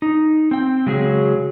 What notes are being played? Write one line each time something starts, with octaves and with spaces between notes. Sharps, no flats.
D#4
C4 G5
C#3 F#3 G#3 F#4 G#4